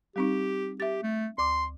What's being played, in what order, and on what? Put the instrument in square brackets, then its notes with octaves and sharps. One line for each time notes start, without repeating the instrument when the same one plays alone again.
[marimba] G3 C4 D#4 [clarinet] G4
[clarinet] G4 [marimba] E5 A6
[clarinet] A3
[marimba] D2 D6 [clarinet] C6